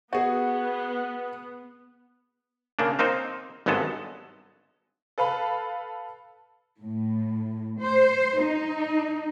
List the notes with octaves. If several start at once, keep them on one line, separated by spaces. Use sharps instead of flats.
B3 F#4 G#4
C#3 A#3 D4
A#3 C4 D#4 C5
G#1 G2 F#3 G#3 B3 A4
A4 B4 F5 A5 B5
A2
C5
D#4